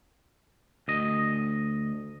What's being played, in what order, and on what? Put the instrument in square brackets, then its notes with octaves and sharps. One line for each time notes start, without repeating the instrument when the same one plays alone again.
[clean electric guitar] D2 D#5